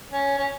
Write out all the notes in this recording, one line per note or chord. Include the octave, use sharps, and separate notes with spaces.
C#4
C#4